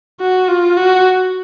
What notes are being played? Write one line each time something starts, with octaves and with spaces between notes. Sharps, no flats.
F#4
F4
F#4